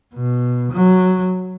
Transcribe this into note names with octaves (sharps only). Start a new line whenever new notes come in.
B2
F#3